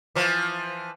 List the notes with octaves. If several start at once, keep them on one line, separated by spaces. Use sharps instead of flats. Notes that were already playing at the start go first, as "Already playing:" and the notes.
E3 F3